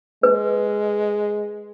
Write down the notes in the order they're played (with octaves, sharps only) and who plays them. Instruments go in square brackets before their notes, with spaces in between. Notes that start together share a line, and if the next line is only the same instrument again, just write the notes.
[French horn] G#3 [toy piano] B4